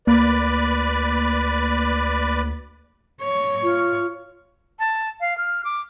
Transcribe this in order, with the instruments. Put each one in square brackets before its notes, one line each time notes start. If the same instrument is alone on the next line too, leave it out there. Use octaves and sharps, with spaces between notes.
[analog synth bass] D2 [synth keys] A#3 [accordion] B4 D5
[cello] C#5
[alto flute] F4
[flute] A5
F5
F6
D6